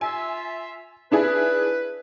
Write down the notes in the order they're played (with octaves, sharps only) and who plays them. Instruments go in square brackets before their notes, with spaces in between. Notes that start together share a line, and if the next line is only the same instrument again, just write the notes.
[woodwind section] F4 E5 [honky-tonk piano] G#5
[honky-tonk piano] D4 E4 G#4 [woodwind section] B4